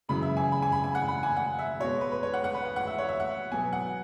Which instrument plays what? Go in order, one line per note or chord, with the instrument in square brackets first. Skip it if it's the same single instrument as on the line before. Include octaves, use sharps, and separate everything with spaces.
[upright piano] F#2 C#3 E3 B5
E5
G#5
B5
G#5
B5
G#5
F#5
B5
G#5
F#5
E5
B2 G#3 B3 C#5
B4
B4
C#5
F#5
F#5
B4
F#5
F#5
E5
C#5
E5
F#5
B2 F#3 B3 G#5
F#5